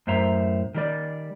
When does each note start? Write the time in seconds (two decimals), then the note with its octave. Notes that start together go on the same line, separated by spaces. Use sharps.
0.07 F#2 A2 C5 E5 A#5
0.74 D#3 G3 D5